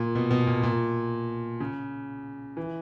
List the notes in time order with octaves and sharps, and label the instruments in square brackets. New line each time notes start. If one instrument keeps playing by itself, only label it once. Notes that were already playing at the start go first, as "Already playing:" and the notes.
Already playing: [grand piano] A#2
B2
B2
A#2
A#2
C#3
E3